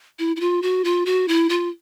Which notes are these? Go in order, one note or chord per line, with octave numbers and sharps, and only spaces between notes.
E4
E4
F4
F#4
F4
F#4
E4
F4